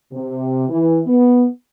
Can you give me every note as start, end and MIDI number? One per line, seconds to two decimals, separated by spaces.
0.13 0.69 48
0.70 0.99 52
1.06 1.46 59